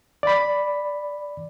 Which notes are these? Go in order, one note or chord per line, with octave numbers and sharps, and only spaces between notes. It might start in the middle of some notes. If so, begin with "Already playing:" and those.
D5 B5